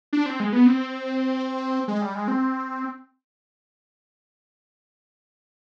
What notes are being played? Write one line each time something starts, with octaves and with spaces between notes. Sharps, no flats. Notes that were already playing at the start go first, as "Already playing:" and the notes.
D4
C4
G#3
B3
C4
G#3
G3
G#3
C4